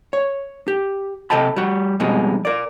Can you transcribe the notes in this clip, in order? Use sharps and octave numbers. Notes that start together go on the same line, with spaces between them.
C#5
G4
C3 A4 D#5 G5 A5 B5
G3 F#4
F2 B2 G3 G#3 D#4
A#4 D5